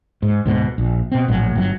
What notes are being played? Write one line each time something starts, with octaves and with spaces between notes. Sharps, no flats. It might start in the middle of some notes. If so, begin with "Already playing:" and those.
G#2
D2 G#2 B2
A#1
B2 C4
A#1 A2 F#3
G1 A#2 F#3